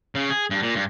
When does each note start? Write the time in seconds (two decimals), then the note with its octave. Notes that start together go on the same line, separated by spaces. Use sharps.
0.15 C#3
0.30 G#4
0.50 G2
0.62 A#2
0.75 G2